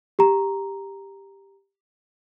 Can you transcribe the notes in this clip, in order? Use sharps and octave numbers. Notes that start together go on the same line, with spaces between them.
G4 A#5